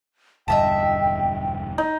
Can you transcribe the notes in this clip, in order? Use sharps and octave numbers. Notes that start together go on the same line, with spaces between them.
E1 D2 G2 D#5 E5 G5 A5
D#4